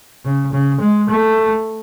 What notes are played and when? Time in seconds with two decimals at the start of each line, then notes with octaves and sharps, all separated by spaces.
0.25 C#3
0.52 C#3
0.81 G#3
1.09 A3